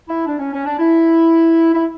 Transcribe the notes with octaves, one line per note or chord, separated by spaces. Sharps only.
E4
D4
C#4
C#4
D4
E4
E4